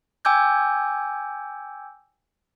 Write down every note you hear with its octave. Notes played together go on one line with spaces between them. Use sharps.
G5 G#5 D6 E6 G6 G#6